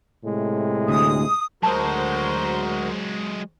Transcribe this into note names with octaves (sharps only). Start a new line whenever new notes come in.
A2 C3 G#3
D2 D#6
D2 F#3 G#3 F#4 A#4 C5 A5 D#6